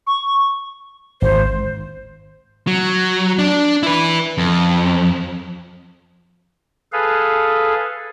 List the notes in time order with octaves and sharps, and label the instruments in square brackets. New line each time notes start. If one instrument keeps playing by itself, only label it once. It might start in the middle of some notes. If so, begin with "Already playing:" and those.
[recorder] C#6
[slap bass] G#1 [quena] C5
[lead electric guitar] F#3
D4
E4 B4
F2
[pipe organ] G#4 A4 B4 F5